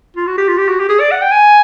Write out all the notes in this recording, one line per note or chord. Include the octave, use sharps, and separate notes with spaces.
F4
F#4
G4
F4
G4
F#4
G4
G#4
D5
F#5
G5
G#5